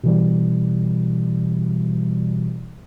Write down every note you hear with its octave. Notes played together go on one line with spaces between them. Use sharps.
B2 E3 G3